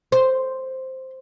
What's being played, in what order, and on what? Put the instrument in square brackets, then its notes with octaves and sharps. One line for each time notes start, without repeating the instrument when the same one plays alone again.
[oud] C5